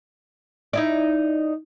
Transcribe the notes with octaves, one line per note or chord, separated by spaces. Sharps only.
D#4 E4 D5